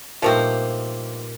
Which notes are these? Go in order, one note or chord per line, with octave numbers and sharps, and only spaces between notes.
G2 A#2 F3 A3 C4 D#4